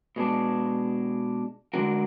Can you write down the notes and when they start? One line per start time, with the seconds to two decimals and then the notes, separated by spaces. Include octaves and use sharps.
0.16 B2 G#3 D4
1.73 D3 G#3 D4 F#4 A#4